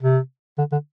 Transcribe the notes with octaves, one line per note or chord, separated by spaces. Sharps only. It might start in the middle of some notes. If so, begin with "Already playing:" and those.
C3
D3
D3